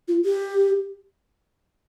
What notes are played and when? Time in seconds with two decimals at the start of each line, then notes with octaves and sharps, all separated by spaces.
0.08 F4
0.25 G4